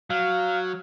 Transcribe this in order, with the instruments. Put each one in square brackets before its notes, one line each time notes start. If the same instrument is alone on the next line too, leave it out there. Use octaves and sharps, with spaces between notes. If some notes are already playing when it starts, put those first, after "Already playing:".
[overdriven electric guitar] F#3 [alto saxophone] F5